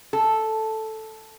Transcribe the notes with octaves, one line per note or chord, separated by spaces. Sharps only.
A4